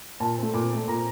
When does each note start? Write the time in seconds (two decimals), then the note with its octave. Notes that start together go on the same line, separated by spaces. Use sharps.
0.20 A#2 A5
0.38 A3 C4
0.54 A#2 D6
0.70 A3 C4
0.88 A#2 A#5